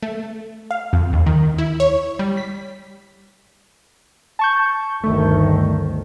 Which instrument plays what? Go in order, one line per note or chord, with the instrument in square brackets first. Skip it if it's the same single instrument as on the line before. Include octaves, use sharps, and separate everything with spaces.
[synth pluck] A3
F5
F2
D#2
D#3
E4
C#5
G3
B6
[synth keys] A5 C#6 G6
[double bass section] G1 D2 D#3 [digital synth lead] A3